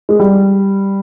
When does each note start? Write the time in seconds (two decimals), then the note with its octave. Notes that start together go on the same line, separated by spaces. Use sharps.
0.09 G#3
0.20 G3